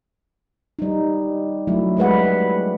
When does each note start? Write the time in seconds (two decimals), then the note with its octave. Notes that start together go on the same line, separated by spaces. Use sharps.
0.79 G3 D#4
1.67 F#3 A3 E4
1.97 G3 G#3 B4 F#5